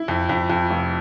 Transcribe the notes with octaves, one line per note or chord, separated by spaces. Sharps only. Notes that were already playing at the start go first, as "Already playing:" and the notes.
Already playing: E4
F2
F2
F2
F1